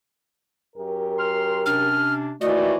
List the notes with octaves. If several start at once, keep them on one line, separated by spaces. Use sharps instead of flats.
F#2 G4 A#4
C6 F6
C3 C#4 D4 F6
D#2 E3 A3 F#4 D5 D#5